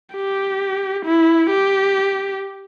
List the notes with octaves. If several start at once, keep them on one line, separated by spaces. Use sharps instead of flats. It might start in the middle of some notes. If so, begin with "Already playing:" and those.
G4
E4
G4